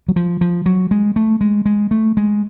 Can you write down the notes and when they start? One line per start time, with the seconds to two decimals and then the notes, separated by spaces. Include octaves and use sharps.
0.08 F#3
0.16 F3
0.41 F3
0.66 F#3
0.91 G#3
1.16 A3
1.41 G#3
1.66 G#3
1.91 A3
2.17 G#3